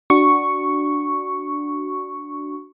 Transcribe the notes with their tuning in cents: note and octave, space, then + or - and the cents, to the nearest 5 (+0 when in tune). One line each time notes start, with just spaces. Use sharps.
D4 +0 F#4 +10 C#6 +0